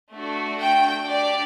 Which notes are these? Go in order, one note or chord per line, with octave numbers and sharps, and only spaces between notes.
A3 D4 F#4
G5
D4 G4 D5